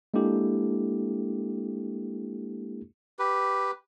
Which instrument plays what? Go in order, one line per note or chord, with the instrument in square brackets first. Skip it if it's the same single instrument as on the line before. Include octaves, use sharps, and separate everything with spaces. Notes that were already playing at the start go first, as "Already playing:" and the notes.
[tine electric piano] G#3 A#3 D4 E4 G4 A4
[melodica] G4 B4